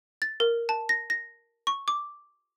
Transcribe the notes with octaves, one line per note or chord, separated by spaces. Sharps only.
A6
A#4
A5
A#6
A#6
C#6
D6